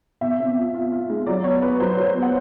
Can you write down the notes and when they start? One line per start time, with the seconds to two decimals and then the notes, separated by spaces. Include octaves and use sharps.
0.21 B2 E5
0.40 C4
0.57 F4
0.74 F4
0.92 F4
1.10 G#3
1.26 F#3 D5
1.44 B3 C#5
1.62 B3 B4
1.80 F#3 C5
1.97 F#3
2.06 C5
2.15 B3
2.22 F#5